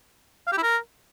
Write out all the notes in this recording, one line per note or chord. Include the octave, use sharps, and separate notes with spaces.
F5
G4
E4
A#4